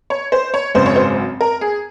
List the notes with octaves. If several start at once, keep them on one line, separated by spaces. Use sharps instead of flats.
C#5
C5
C#5
G#1 F#2 C#3 C5
C#5
C5
A#4
G#4